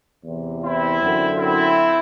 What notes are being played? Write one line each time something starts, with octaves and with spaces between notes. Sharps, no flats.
E2 C3 E3
C4 E4
F#2 D3
C4 E4